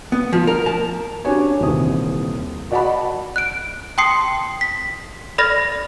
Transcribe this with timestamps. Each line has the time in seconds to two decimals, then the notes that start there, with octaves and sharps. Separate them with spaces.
0.12 B3
0.33 F3
0.47 A#4
0.66 A5
1.24 C#4 D4 F#4 G4 C#5 G#5
1.60 D#1 D#2 C3 E3 D#6
2.71 F#4 D5 D#5 F#5 A5 B5
3.36 F#6 D7
3.98 G5 A5 C6 D#6 C7 C#7
4.61 B6
5.38 A4 D5 B5 F6 A6 A#6